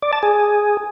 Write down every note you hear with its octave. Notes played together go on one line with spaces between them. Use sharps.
D5
A5
G#4